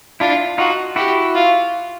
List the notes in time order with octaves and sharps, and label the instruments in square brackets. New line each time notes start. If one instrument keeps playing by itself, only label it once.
[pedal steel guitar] D4 E4 [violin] F4
[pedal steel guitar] D#4 F4 [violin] F#4
[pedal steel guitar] E4 F#4 [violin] G4
[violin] F4